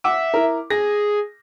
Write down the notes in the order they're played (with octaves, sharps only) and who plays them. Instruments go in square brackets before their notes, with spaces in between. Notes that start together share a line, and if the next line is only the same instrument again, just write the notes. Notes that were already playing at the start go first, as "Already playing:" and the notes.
[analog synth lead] E5 [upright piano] F#5 D6
[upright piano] E4 A#4
[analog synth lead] G#4 [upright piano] A#6